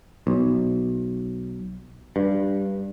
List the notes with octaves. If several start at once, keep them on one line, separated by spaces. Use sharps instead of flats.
B1
G2